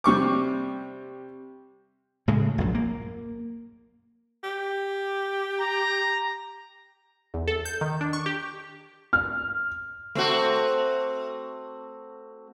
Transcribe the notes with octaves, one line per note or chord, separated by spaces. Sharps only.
C3 G3 C#6 D6
A2 C#3 G#3
A#1 F#2
A#3
G4
A#5
E2
A4
G6
D#3
D4
C#6
G4
F6
A3 C4 F#4